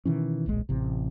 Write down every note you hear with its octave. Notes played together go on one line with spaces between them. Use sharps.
B2 D#3 E3 C#4
D1 A#1 G#3
A1 C3